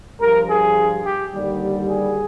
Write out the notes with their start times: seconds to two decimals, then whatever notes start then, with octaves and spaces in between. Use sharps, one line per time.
0.21 G2 F3 A#4
0.49 G#4
1.05 G4
1.33 D#2 D3 G3
1.89 G#4